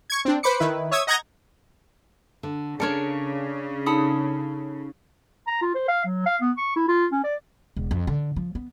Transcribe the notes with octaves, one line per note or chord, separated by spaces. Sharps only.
C#6 G#6
C4 D4
B4 C5 B5 D6 C#7
D#3 E4 B4
C#5 E5 D#6 E6 G#6
D#5 F#5 A#5 G6 G#6 A#6
D3
C#3 D4 A4 A#4 C#5 D5
D#4 A4 B5 D#6
A#5
F4
C5
F5
F#3
F5
B3
C#6
E4
F4
C#4
D5
E1
F2
D3
F3
B3